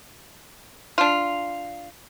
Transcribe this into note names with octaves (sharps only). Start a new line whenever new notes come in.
D4 F4